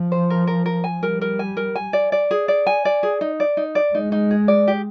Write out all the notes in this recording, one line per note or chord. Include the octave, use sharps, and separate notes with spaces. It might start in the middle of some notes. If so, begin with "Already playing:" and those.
Already playing: F3
C5
A#4
A#4
A#4
G#5
G3 A#4
A#4
G#5
A#4
G#5
D5
D5
G#4
D5
G#5
D5
G#4
D#4
D5
D#4
D5
G#3 D#4
D#4
G#4
D5
G4